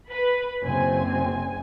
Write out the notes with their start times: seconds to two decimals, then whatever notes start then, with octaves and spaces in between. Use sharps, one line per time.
0.11 B4 B5
0.64 F#1 C4 G#5